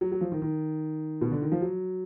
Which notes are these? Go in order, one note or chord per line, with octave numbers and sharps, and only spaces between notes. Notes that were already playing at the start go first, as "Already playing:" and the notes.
F#3
F#3
F3
D#3
D#3
B2
D3
D#3
F3
F#3